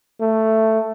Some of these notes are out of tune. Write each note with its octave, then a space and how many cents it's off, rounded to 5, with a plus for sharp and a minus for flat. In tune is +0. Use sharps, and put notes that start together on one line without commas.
A3 +5